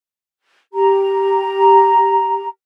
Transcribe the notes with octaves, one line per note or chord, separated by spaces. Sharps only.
G4 A#5